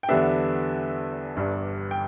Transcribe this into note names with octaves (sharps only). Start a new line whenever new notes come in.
G5
E2 D3 G3 B3 D4 E5
G1 G2 G3 D4
G5